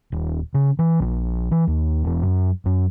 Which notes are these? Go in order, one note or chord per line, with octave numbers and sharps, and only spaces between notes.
D#1
C#3
E3
A#1
E3
D#2
E1
F#2
F#2